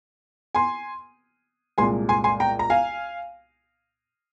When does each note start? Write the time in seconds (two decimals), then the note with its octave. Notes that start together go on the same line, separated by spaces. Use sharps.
0.55 G#5 C6
1.78 C2 A#2 G#3 G#5 C6
2.09 G#5 C6
2.24 G#5 C6
2.40 G5 A#5
2.59 A#5
2.70 F5 G#5